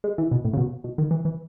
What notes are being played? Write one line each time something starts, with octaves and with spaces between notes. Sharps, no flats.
G#3
E3
B2
A2
C#3
B2
B2
D#3
E3
E3